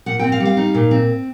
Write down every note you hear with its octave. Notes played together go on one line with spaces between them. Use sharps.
A#2 F#5
G5
C4
F5
G3
F5
D#4
A#2
C4